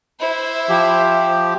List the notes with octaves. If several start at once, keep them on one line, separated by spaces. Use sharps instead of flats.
E4 C5
F3 G4